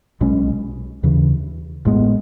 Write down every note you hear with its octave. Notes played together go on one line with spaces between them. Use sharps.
B1 B2 G#3 C#4
D#2 C#3 E3
A1 A2 G#3 B3